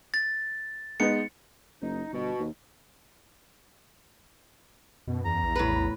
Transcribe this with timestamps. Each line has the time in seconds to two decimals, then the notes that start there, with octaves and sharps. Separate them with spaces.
0.14 A6
1.00 G#3 B3 D#4 C#7
1.81 F#1 D#4
2.12 G1 B2
2.40 D#2
5.07 F#2 B2
5.25 E2 A#5
5.43 A#1
5.56 A2 B4